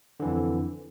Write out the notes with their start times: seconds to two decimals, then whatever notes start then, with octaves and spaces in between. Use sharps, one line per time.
0.20 D3
0.22 E3
0.25 F2